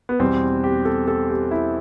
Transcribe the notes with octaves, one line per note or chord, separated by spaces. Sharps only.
B3
E2 B2 G3 C4
G4
A4
A4
G4
E4